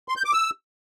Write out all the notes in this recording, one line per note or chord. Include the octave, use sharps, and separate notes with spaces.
C6
G6
D6
E6